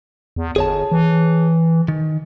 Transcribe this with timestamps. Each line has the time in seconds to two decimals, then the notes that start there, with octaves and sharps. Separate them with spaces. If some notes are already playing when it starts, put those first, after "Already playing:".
0.36 E2
0.56 G1 G#4 C#5 A5
0.92 E3
1.88 D#3